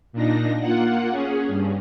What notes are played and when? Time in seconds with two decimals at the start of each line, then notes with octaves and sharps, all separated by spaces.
0.13 A#2 D4 D#4 A#6
0.60 A#3 F4 F#5
1.11 C#4 G#4
1.48 G2